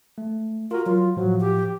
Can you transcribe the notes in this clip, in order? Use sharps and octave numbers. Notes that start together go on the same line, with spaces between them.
A3
F4 F#4 A#4
F#3 F4
A2 F3 F#3
G4